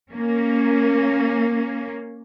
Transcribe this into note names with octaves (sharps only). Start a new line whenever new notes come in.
A#3 C#4